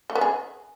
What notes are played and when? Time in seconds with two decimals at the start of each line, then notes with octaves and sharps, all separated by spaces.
0.10 A3
0.15 B3
0.21 G#4